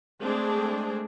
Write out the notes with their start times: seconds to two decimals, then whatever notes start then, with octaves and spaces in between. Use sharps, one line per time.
0.21 G#3 A3 C4 D4 G#4